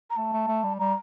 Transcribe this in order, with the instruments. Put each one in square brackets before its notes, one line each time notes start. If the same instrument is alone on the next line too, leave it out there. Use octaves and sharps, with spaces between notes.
[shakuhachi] A#5
[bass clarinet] A3 [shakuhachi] A5
[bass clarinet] A3
A3
G3
[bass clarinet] G3 [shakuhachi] A#5